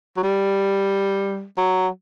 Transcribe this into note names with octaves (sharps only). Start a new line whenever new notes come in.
F#3
G3
F#3